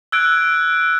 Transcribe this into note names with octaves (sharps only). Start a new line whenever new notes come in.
E6 F#6 G#6 D7